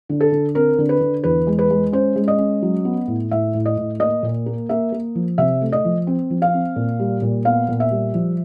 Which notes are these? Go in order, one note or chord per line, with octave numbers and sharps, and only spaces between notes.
D3
A4
D3
C4 A#4
D3
B4
D3
E2 B4
G#3
B4
G#3
C#4 C5
G#3
D#5
C#4
F#3
B3
A2
A2 E5
A2
D#5
A2
A#3 D#5
A#2
A#3
A#3 E5
A#3
F3
C3 E5
A3
D#5
F3
C4
F3
F5
C4
A#2
G3
A#2
B3 F5
A#2
E5
G3
F3